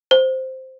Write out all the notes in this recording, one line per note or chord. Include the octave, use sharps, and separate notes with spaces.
C5